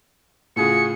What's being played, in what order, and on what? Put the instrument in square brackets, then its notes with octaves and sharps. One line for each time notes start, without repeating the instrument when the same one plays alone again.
[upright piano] A2 C#3 F4 [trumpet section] F#4 G#4 [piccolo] C#7